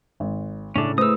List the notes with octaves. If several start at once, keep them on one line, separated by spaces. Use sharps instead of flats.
G#1
A2 C#3 A3 C#4 D4
A3 E4 G#4 B4 C5 D#6 E6